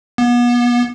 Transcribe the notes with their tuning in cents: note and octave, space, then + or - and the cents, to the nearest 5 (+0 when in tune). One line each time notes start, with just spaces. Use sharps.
B3 -35